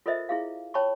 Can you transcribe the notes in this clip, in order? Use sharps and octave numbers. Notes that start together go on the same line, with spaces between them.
F4 A4 A#4 C5 D#5 E5
E4 G#4 F5
C#5 G5 A5 B5 C#6